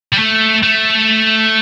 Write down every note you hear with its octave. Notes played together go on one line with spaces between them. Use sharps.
G3
A3
A3